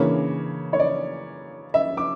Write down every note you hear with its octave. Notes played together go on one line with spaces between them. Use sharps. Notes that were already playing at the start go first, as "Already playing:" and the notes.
Already playing: C#3 E3 A#3 D4 C#5
C#5
D5
E5
D6